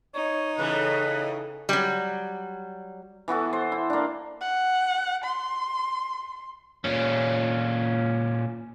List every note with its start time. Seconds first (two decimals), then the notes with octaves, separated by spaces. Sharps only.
0.14 D#4 C#5
0.59 A2 C#3 E3 B4
1.69 F#3 G3
3.28 E3 B3 F#4 A4
3.53 C5
3.72 E4
3.90 A#3 D4
4.41 F#5
5.24 C6
6.84 A#2 C#4